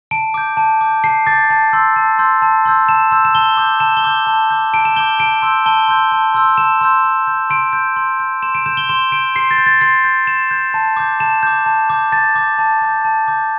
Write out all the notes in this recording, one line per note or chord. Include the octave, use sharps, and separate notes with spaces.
A5 D7
D6 G6
A5
D6 G6
A5 C7
D6 G6 A6
A5
C6 E6 G6
A5
C6 E6 G6
A5
C6 E6 G6
A5 E7
C6 E6 G6
E7
A5 G7
D6 G6
A5 E7
G7
D6 G6
A5
D6 G6
A5 D7
E7
D6 G6 G7
A5 D7
C6 E6 G6
A5 G7
C6 E6 G6
A5
C6 E6 G6
A5 E7
C6 E6 G6
C6
G6
C6 D7
G6
C6
G6
C6 E7
D7
G6 E7
G7
C6 E7
G6 D7
C6 C7
A6
G6
A6
C6 C7
G6
C6 E7
G6
A5
D6 G6
A5 E7
D6 G6
A5
D6 G6
A5 A6
D6 G6
A5
D6 G6
A5
D6 G6